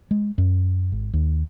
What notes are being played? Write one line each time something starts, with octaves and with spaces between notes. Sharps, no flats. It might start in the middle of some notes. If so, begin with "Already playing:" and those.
G#3
F#2
G#1
D#2